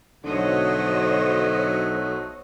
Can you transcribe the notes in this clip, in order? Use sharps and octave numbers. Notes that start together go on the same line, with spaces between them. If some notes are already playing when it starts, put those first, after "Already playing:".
B1 D3 F#3 A3 F#4 C5 C#5 D#5